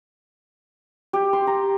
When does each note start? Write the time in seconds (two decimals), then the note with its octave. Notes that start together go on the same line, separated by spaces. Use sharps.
1.13 G4
1.33 C6
1.47 A#5